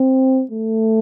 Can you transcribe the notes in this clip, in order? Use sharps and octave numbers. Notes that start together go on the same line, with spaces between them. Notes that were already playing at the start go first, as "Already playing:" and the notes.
Already playing: C4
A3